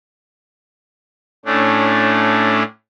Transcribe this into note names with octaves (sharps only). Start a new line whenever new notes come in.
A2 A3 C#4 D4